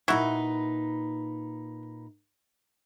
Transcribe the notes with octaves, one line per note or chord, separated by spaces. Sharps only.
A#2 D#4 E4 F#4 B4